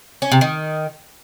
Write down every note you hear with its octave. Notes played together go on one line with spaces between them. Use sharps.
C#4
C3
D#3